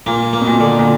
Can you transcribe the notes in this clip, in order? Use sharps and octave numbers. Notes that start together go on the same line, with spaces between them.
A#2 A#3
A#3
B2
A#2
D3
A#2